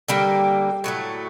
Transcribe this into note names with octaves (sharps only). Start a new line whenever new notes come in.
D3 G3 A#3 G5
A2 F#3 A3